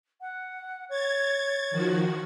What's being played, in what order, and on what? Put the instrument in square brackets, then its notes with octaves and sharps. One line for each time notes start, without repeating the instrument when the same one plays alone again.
[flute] F#5
[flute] C#5 [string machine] G#6 A6
[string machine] D#3 F3 F#4